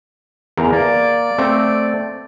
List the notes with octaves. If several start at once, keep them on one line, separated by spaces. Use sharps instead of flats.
E2 A#4 A#5
A#3 D5
A3 C4